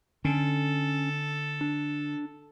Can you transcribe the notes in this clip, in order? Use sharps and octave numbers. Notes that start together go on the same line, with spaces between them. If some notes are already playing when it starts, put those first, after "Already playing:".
D3 C#4 A4
D4